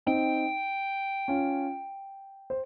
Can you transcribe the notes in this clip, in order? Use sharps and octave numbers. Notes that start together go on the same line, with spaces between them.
C4 D#4 G5
C#4 F4
C5